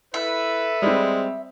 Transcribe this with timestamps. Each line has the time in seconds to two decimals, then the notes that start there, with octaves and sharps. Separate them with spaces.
0.14 E4 A4 B4 E5
0.82 G3 G#3 C4